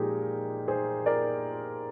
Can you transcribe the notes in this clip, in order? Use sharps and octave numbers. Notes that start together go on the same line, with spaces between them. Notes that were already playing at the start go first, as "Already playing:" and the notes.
Already playing: A#2 F3 G#3 D#4 G4 G#4 A#4
G#4 C5
A#4 D5